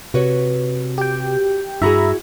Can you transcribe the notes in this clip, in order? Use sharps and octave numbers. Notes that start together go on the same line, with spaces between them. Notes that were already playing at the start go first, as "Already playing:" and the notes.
C3 F#4 B4 C#5
G4 G5
G2 E4 F#4 G#4 E5 A#5 B5